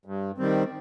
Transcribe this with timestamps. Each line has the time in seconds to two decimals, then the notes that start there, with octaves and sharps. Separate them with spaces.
0.05 G2
0.38 D#3 G3 C4